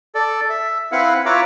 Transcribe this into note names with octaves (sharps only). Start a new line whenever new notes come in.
A4 D5
E5
C4 E4 B4 F5 F#5
F4 B4 C#5 E5 A#5 D6